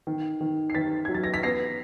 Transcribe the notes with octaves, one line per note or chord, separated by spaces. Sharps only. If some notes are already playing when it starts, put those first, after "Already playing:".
D#3
D#3
C7
D#3 A6 B6
F#3 G#6
A6
A#6
B6
B3 A#6 C7